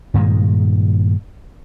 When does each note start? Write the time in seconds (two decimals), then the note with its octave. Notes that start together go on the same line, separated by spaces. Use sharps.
0.14 G2 A#2 D#3 G#3